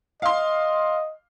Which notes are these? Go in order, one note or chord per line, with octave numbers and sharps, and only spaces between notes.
D#5 F5 C6